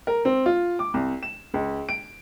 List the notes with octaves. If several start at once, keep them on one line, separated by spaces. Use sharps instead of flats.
A#4
C4
F4
D6
C2
E7
C#2
D7